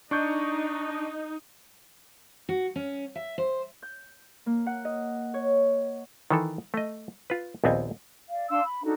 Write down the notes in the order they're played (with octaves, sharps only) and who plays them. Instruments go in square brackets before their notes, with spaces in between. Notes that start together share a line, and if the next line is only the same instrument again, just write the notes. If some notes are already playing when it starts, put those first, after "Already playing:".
[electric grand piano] D4 C#6 G6 [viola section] D#4
[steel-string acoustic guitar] F#4
C#4
E5
C5
[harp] G6
A#3
F#5
D#5
C#5
[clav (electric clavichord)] D#3 E3 A4
A3 D#5
F4 B4
A#1 D#2 B3 C4 D#5 G#5
[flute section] D5 F5
D4 F5 C6 E6
B5
D4 D#4 F#4 A4